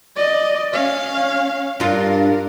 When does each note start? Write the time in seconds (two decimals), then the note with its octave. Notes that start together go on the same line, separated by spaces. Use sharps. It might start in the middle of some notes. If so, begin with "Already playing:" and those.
0.16 D5 D#5
0.72 C#4 F5
1.80 G2 D4 F4 A#4